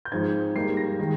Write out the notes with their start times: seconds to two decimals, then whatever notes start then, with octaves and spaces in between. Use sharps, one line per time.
0.05 G6
0.12 G#2 F3 C4 D#4 G#6
0.55 G#2 G3 A#3 D#4 C7
0.77 A#6
0.99 D#3 G#3 D#4